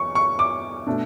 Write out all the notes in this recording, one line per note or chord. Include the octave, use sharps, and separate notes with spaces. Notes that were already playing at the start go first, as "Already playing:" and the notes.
Already playing: E2 C#6
C#6
D6
B2 A3 D4